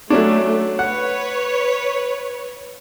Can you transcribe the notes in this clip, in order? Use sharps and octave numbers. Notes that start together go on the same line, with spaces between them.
F#3 A3 C#4 D4
B4 C#5 F#5